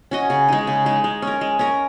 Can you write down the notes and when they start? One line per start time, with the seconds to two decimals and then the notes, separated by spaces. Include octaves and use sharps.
0.11 C#4 F#4 D#5
0.30 C#3
0.48 G#3 D#4
0.67 C#3
0.86 G#3 D#4
1.04 G#3
1.22 C#4 A#4
1.41 G#3
1.59 C#4 A#4